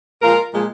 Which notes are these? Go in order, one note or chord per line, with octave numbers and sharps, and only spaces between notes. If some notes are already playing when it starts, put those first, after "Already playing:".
A#2 F3 G#3 F4 A#4
A#2 F3 G#3